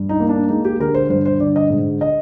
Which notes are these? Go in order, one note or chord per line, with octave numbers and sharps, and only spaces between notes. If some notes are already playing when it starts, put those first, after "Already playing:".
Already playing: G2
D#4
A#3
D4
G#3 D#4
G4
D3 A#4
C5
G2 C5
C5
D3 D5
D#5
G#2
D#5